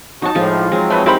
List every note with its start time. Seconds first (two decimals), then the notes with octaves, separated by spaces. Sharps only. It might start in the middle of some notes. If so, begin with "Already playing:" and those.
0.22 F#3 D#4 F#4 A5
0.35 A2 F3 G#3 F4
0.72 F#3 G#3 C4
0.90 A3 B4 D#5
1.06 D#4 E4 G4 A#4 C5 B5